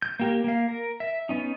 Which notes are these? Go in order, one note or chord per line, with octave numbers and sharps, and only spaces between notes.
G6
A#3 G4 A#4
A#3 F5
A#4
E5
B3 C#4 D#4